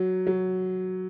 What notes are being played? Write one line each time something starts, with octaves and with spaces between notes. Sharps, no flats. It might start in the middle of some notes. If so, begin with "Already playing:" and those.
Already playing: F#3
F#3